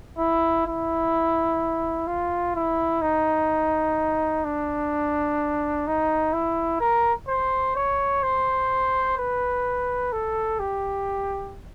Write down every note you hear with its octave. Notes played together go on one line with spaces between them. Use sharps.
E4
E4
F4
E4
D#4
D4
D#4
E4
A#4
C5
C#5
C5
B4
A4
G4